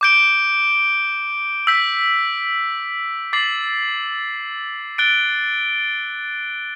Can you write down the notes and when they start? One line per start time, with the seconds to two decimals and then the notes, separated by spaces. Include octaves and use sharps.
0.01 D6 G6 D7 G7
1.67 E6 G6 B6
3.33 D6 A6 C7 F#7
4.98 F#6 A6 D7 G7